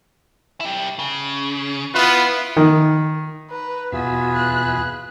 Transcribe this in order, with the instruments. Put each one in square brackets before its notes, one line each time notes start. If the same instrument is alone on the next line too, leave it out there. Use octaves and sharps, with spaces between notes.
[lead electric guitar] E4 G4
C#3
[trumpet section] B3 F4 B4 [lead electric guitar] E4
[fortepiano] D#3
[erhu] B4 [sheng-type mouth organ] A#5
[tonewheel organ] E2 B2 E5 [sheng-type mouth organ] B3 F4 G#4 [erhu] F#4
[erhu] F#6